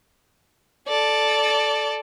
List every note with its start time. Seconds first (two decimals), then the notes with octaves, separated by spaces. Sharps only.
0.88 A4 D5